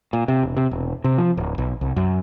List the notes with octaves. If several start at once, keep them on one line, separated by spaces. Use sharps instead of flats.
A#2
C3
E1
C3
E1
C3
F3
D1
B1
C2
F#2